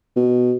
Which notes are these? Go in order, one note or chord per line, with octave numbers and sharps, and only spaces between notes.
B2